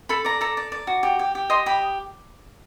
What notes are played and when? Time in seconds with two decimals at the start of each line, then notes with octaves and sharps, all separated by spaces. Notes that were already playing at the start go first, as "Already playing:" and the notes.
0.09 A4 B5
0.25 D5 A#5
0.41 A4 A#5
0.57 D5
0.72 D5
0.87 F#4
1.03 G4
1.19 G4
1.35 G4
1.50 D#5 C6
1.66 G4 B5